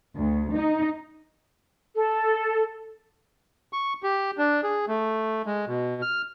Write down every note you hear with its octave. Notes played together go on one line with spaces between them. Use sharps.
D2
D#4
A4
C#6
G4
D4
G#4
A3
G#3
B2
F6